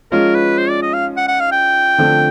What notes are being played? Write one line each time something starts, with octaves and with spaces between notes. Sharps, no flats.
F3 G#3 C#4 F4 A#4
B4
C5
D5
D#5
F5
F#5
F#5
F5
G5
D3 F3 A3 C4 F4